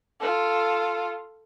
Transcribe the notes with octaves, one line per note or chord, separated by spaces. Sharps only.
F4 A4